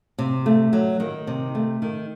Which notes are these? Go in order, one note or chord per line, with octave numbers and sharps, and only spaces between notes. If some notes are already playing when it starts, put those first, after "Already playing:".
C3
A3
F#3
D#3
C3
A3
D#3